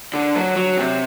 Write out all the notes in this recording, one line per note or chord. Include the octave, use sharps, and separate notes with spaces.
D3
F#3
F#3
C3